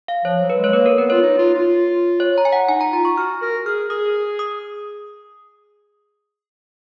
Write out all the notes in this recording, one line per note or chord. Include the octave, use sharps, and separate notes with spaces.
F5
F3 C#5
F#3
B4
G#3
C#5
A#3 B4
A#4
B3 B4
F4 C#5
D#4
F4
F4
C#5
A#5
G#5
F#5
D#4 G#5
A#5
F4 A#5
C#6
F#4 F6
A#4
G#4 F6
G#4 D#6
D#6